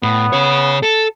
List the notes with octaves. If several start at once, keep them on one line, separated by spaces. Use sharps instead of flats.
A2 B3
C#3 C#5
A4